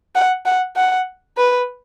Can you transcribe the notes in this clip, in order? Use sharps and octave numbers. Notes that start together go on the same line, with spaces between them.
F#5
F#5
F#5
B4